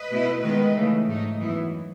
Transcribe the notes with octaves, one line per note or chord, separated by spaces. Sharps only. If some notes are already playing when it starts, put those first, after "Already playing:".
Already playing: B4 D#5
B2 A3 E4
D#3 G#3 B3 D#4 B4 D#5
C#3 E3 A3
G#2 F#3 A3 D#4
F#2 E3 B3 E4